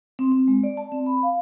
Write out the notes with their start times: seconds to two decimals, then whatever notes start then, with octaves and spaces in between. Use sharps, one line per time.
0.19 C4
0.32 C4
0.48 G#3
0.63 D5
0.77 A5
0.92 C4
1.06 B5
1.23 F5